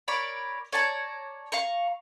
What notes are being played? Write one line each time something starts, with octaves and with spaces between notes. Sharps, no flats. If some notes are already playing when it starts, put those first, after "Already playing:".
A#4 C#5 D5 B5
C#5 D5 A5 A#5
F5 A#5 C#6